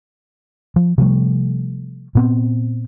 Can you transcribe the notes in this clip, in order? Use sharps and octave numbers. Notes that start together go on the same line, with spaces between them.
F3
C3 F3 G3 A3
A#2 B3 C4